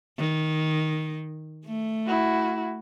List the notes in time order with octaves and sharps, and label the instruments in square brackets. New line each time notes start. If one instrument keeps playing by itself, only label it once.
[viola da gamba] D#3
A3
[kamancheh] E4 F#4